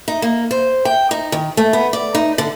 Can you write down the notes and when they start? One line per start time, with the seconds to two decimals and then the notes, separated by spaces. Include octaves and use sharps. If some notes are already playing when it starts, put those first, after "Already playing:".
0.08 D#4
0.22 A#3
0.51 C5
0.85 G5
1.11 D#4
1.32 D#3
1.57 A3
1.73 B3
1.93 D5
2.15 D#4
2.38 D3